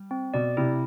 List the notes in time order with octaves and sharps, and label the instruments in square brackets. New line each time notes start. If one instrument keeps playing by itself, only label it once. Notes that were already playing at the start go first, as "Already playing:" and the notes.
Already playing: [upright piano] G3
[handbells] C4
[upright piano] B2 [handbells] D5
[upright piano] C3 [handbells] E4